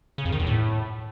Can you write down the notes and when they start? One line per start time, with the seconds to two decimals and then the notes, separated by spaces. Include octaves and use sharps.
0.18 C#3
0.25 F2
0.32 D#3
0.39 E2
0.46 A2